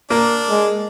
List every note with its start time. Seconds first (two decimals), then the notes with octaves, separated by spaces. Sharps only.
0.10 A#3 D4
0.49 G#3